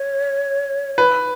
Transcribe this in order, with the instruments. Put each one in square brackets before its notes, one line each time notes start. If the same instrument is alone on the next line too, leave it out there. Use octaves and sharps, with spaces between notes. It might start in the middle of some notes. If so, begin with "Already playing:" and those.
Already playing: [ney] C#5
[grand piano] B4